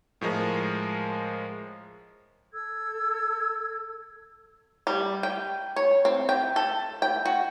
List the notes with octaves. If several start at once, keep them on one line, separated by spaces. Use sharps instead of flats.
A2 F3 G#3 A#4
A4 E6 G#6
G3
G5
C#5
C4
G5
A4
G5
F#4